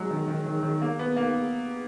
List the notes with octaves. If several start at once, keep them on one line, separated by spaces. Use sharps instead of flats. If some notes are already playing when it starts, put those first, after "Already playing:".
Already playing: F#3 G#3
D#3
D#3
D#3
D#3
A#3
B3
A#3